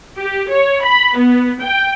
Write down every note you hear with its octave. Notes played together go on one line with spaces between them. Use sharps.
G4
C#5
B5
B3
G5